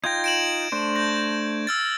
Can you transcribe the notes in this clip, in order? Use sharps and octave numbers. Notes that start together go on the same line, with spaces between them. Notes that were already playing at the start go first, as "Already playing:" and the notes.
D#4 F4 G5 G#6 A#6
D7 E7 F#7
A3 D4 C5
G6 A#6
E6 F6 A6